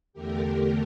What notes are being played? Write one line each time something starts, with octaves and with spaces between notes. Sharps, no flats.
E2 D3 A3 G4 A#4